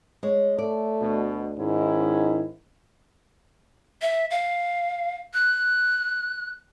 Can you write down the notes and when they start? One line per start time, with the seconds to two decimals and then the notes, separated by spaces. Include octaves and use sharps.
0.23 G#3 C#5
0.58 A3 D5
1.00 D2 B2
1.58 G#2 D#3 C#4 E4
4.02 E5
4.31 F5
5.34 F#6